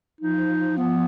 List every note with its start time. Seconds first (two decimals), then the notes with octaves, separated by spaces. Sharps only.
0.21 F3 D#4
0.78 B3